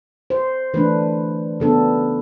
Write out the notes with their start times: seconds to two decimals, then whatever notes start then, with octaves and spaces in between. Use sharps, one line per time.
0.30 C5
0.74 E3 A3 D4 B4
1.60 C#3 F#3 B3 D4 A4